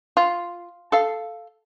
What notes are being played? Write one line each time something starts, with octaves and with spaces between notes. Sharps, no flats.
F4
A4 F5